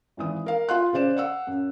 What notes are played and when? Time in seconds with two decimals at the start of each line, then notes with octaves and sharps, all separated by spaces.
0.17 G#1 E3 D#6
0.46 A#4 F5
0.69 F4 C6 F#6
0.93 C#3 C5 D5 E7
1.17 F5 F#5 E6
1.47 F#2